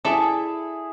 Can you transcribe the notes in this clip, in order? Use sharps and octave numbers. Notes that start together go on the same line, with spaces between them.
E4 G#4 A4 D5 E5